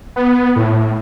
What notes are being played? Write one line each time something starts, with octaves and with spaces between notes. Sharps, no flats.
B3
A2